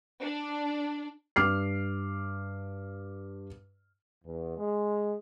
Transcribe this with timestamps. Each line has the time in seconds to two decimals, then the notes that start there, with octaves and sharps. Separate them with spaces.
0.22 D4
1.36 G2 D6 F6 C7
4.23 E2
4.57 G#3